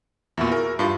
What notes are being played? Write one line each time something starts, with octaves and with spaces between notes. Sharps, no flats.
E2 A#2 E4 F#4 C#6
G#4 A#4
G2 F4